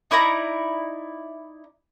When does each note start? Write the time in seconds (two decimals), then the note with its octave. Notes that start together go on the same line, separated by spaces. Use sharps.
0.11 D#4 E4 D5 A#5